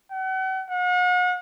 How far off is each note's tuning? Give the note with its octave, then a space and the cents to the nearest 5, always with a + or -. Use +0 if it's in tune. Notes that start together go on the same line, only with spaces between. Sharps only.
F#5 +40
F#5 -40